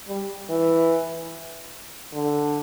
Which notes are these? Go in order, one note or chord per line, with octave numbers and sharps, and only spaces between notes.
G3
E3
D3